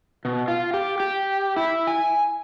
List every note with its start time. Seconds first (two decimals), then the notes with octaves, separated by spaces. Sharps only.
0.25 B2
0.48 F4
0.74 G4
1.00 G4
1.57 E4
1.87 G#5